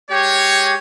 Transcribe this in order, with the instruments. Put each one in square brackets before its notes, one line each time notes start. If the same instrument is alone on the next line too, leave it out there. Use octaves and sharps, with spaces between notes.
[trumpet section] G#3 C#5 [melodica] G4